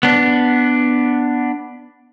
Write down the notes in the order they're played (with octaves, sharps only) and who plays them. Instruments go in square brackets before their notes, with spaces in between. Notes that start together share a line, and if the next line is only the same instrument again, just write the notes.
[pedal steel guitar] B3 D4